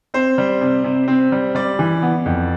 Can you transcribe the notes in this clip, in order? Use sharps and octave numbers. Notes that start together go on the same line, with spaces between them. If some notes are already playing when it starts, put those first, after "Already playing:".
C4 C5
G3
C3
C3
C4
G3
G3 D5
E3
B3
F2